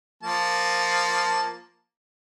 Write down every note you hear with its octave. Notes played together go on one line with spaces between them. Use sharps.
F3 A#3 A5